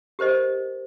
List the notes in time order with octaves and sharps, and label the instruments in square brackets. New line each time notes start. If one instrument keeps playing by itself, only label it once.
[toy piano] G4 A#4 C5 D#5